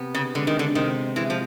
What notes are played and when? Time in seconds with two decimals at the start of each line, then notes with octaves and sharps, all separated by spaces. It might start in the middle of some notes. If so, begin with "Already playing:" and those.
Already playing: C3 B3
0.15 C#3
0.35 D3 G#3
0.47 D#3
0.59 D3
0.75 C3 D#3
1.16 E3 G#3
1.30 F3